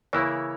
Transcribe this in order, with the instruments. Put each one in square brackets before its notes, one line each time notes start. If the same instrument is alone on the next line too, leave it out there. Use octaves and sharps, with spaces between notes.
[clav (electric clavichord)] C#3 E3 A#3 E4 [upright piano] C#5